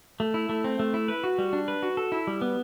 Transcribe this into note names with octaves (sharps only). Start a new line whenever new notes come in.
A3
E4
A3
C4
A3
E4
B4
F#4
G3
D4
B4
F#4
A4
E4
G3
B3